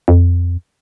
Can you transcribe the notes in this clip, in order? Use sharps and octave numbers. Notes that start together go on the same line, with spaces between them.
F2